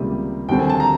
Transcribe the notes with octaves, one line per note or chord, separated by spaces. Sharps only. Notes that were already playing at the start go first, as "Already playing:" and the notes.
Already playing: C#2 C3 D#3 G3 A#3
D#2 D3 G3 C4 G5
G#5
A5
A#5